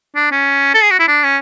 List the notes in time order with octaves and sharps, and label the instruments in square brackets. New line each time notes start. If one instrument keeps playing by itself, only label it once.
[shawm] D4
C#4
A4
G#4
F#4
E4
D4
C#4